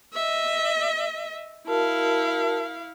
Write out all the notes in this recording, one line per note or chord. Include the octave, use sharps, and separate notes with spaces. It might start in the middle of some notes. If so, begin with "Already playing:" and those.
D#5 E5
E4 F#4 A#4 F5 A5